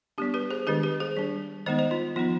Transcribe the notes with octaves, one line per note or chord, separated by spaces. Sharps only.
G3 B3 D4 G4
G4 B4
G#4 C5
D#3 G#3 D4 G4 B4
G4 B4
G#4 C5
G3 D4
D#3 G#3 B3 D#4 C5 D#5
C5 D#5
F4
F3 B3 D#4 F4